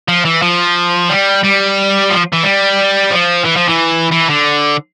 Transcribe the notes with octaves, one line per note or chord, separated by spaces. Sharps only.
F3
E3
F3
G3
G3
F3
E3
G3
F3
E3
F3
E3
E3
D3